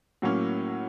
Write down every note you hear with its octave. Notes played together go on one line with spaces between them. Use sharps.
A2 F#3 A#3 C#4